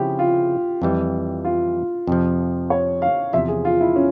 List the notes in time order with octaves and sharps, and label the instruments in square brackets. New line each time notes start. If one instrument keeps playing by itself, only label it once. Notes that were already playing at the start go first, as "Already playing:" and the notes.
Already playing: [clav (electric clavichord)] C#3 F3 C4 E4 G#4 [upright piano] G4
[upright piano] F4
[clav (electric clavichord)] F2 E3 G3
[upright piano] F4
[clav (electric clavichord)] F2 C3 F3
[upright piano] C#5
F5
[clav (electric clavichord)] E2 C3 F3 [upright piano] E5
[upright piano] G#4
F4
E4
C#4